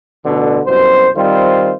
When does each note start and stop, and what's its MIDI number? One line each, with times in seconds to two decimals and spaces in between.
0.24 0.59 33
0.24 0.59 47
0.24 0.59 50
0.65 1.08 36
0.65 1.08 42
0.65 1.08 47
0.65 1.08 72
1.16 1.72 51
1.16 1.72 55
1.16 1.72 60
1.16 1.72 65
1.16 1.72 72